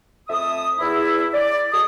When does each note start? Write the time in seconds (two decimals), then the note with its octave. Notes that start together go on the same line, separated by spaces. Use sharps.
0.28 F2 A3 E5 D#6
0.79 E2 E4
1.33 D5
1.73 F#3 G#3 A4 C#5 D#6